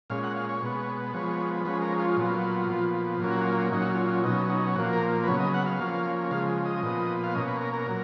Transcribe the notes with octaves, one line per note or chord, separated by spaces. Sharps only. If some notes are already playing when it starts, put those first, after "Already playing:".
A#2 G#3 C#4 F5
F#5
F5
C#5
B2 G#3 B3
F3 G#3 B3 C#5
F3 G#3 C#4 B4
A#4
F4
A#2 F#3 B3
A#2 F3 B3
A#2 F#3 A#3 C#4 F4
F#4
F4
A#2 F#3 C#4 D#4
F#4
F4
F4
B2 F#3 C#4 D#4
D#4
A#2 F3 A#3 F#4
A#4
B4
C#3 F#3 B3 C#5
D#5
F#5
F5
F3 A#3 C#4
C#3 F3 G#3 F5
D#5
A#2 F3 B3
F5
B2 A#3 C#4 D#5
B4
A#4
A#4
A#2 F#3